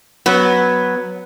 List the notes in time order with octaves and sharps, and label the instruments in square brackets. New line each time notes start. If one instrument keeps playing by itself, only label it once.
[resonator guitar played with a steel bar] F#3 B3